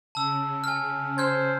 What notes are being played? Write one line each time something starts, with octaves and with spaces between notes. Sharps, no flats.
C#3 A5 E6
G#5 F6
C5 F6 G6 G#6